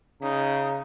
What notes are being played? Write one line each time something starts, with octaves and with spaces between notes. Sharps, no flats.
C#3 D#4 A#5